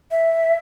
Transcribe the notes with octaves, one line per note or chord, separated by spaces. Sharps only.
E5